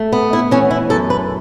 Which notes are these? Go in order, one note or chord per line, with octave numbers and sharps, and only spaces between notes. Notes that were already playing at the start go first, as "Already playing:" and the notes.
Already playing: A3
B3
E4
E3 C#4
E4
F#2 A4
B4